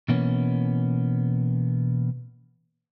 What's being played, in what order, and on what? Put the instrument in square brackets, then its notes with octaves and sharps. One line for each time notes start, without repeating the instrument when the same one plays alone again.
[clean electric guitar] B2 E3 A#3 B3 C#4